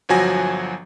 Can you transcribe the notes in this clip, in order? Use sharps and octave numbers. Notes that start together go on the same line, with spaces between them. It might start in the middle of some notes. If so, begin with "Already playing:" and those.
G1 F3 F#3 F#4 G#5 A#6